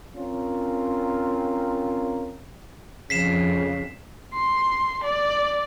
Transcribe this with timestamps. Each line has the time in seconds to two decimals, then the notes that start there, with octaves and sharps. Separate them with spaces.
0.17 C4 C#4 F4 A#4
3.10 F2 C#3 B6 C7 E7
4.34 C6
5.04 D5